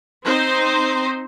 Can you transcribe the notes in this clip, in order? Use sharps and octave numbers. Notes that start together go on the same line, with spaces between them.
C4 D#4 C5